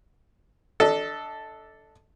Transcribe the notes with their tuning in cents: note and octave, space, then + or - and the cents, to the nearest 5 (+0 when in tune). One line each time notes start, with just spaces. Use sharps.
D4 +0 A4 +0 D#5 +35